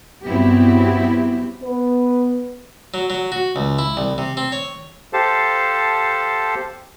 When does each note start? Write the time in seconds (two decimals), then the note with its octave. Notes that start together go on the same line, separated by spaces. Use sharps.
0.25 G2 F#3 B3 C4 E4 G4
1.63 B3 B4
2.94 F#3
3.10 F#3
3.32 F#4
3.56 C#2
3.79 E4
3.97 C2
4.18 C3
4.37 C4
4.52 C#5
5.13 G4 A4 C5 F5 A5